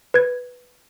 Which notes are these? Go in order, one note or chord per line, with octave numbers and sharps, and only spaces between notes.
B4 G#6